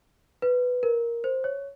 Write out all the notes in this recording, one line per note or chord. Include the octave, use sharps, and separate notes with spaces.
B4
A#4
C5
C#5